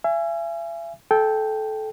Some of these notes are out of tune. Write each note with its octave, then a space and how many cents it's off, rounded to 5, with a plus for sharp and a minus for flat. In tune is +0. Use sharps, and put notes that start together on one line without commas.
E5 +40 G#5 -5
A4 -20 G5 +0